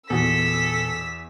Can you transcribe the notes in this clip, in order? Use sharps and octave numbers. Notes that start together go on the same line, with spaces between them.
E2 A#2 F#4 A4 E6 B6